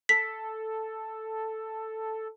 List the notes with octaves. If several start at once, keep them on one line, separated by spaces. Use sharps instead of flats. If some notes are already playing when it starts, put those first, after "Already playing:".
A4 B6